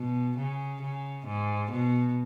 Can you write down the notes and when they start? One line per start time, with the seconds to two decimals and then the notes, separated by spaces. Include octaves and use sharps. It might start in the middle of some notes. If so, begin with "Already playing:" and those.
Already playing: B2
0.37 C#3
0.82 C#3
1.27 G#2
1.71 B2